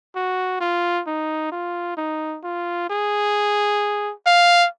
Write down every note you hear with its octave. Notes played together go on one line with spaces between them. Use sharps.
F#4
F4
D#4
F4
D#4
F4
G#4
F5